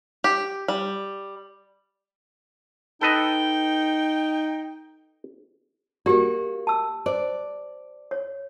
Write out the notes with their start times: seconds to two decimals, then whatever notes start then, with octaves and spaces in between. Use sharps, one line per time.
0.24 G4
0.68 G3
3.01 D#4 A4 B4 D#5 G5
6.06 A#3 F#4 G4 D5
6.67 A5 E6
7.06 C5 D5
8.11 C#5